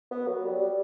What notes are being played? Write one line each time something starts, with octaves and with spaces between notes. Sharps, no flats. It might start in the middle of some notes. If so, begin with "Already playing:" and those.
B3
F#3
G3
G3